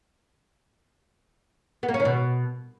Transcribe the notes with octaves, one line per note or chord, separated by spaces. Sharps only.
B3
A#3
C#4
D#3
B2